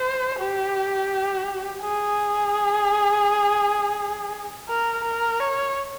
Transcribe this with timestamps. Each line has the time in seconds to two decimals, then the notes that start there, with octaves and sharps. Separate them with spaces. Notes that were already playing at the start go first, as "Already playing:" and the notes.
Already playing: C5
0.39 G4
1.82 G#4
4.69 A#4
5.04 A#4
5.40 C#5